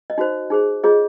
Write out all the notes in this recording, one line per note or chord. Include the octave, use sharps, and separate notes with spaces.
D#5
D#4 F#4 C5
D#4 G#4 C5
F4 G#4 C#5 D#5